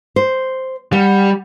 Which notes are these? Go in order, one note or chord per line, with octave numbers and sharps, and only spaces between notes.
C5
G3 F#5